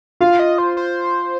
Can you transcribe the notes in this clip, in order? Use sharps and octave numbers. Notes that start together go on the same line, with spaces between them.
F4 F5
D#5
C5
C5